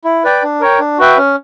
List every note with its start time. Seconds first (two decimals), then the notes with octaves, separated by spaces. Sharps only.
0.05 E4
0.24 B4 D5 G5
0.43 D4
0.61 A#4 C#5 G5
0.79 D4
0.98 F#4 B4 E5 G5
1.17 C#4